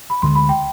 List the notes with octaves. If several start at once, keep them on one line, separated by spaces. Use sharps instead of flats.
B5
D2 D3 G#3 C6
B5
G5